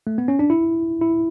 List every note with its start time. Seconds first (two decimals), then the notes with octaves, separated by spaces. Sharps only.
0.07 A3
0.18 B3
0.28 C#4
0.39 D4
0.50 E4
1.01 E4